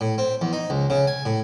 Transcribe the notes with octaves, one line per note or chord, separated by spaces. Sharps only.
A2
C4
E2
D#4
C#2
C#3
G#5
A2